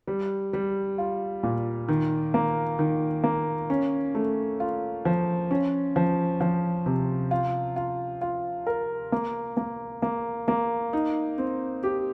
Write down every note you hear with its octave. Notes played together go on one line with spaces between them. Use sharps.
G3
G3
F4
A#2
D#3
A#3
D#3
A#3
C#4
A3
F4
F3
C#4
F3
F3
C3
F4
F4
F4
A#4
A#3
A#3
A#3
A#3
D#4
C4
G4